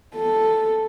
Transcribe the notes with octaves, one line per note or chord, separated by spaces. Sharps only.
A4